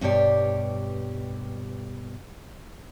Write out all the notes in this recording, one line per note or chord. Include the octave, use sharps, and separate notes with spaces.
G2 B2 G3 G4 C#5 D5